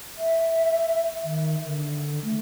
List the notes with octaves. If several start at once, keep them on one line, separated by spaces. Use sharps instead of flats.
E5
D#3
D3
A3